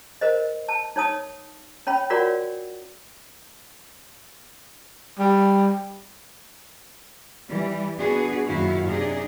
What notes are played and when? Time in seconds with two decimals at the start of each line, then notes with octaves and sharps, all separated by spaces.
0.21 A#4 C5 D#5
0.68 A5
0.96 D#4 C#5 A5 D#6
1.87 C#4 C#5 G5 B5
2.10 F4 F#4 A#4 C#5 D5 F#5
5.19 G3
7.49 E3 G3
7.98 B3 D4 F#4 G#4 B4
8.47 F#2 A#2 D#3 E4 F#4 F5
8.87 C3 D4 D#4 G#4